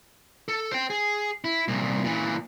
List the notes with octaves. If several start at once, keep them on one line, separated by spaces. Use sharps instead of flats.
A4
C5 G5
G#4
E4
C2 A#2
A#2 E3